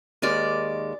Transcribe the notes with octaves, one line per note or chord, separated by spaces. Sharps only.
D#2 D#3 G#3 D5